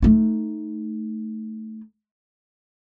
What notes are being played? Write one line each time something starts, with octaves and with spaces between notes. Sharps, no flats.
A3 D#4